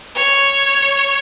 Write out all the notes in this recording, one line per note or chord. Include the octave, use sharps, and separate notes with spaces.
C#5